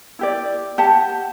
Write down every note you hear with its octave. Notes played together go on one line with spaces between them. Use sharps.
E4 G4 D5
G4 F#5 A5